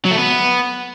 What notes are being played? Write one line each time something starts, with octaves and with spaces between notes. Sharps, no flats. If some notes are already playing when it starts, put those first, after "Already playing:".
F#3
A3
B3